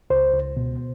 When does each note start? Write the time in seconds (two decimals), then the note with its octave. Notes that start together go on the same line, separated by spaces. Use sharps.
0.10 C#2 C5
0.34 C#2
0.57 B2